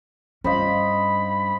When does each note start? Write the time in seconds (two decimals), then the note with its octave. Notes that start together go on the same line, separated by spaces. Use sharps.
0.44 G2 C#4 C5 D#5 F5 B5